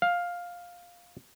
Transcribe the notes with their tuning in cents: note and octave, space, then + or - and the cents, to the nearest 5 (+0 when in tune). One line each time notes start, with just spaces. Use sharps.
F5 +10